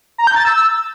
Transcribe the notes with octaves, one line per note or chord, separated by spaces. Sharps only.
A#5
G6
A6
E6